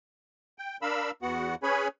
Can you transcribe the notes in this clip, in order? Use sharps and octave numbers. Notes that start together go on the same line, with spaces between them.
G5
D4 A#4 F5 B5 E6
E2 B3 F#4 F#5
C#4 G#4 B4 C#5 G#5 B5